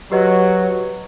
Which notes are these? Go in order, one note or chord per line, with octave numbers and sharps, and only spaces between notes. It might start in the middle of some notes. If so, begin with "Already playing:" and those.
F#3 G4 B4 D#5